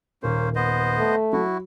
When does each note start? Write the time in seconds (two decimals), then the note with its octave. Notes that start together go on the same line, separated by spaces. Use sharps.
0.23 D#1 A#3 C#4 A#4 C5
0.55 B3 C5 D#5
0.98 A3
1.33 F#3 E4 F#4